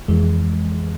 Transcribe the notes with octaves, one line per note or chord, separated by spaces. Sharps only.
F2 E3 G#3